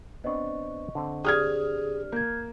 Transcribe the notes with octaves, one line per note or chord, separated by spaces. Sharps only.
B3 C4 D4 D#5 C#6
D3 C4
G4 G#4 D5 D#6 F6 G#6
A#3 G6 G#6